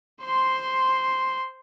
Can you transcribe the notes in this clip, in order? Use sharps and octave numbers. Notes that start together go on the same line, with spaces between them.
C5 C6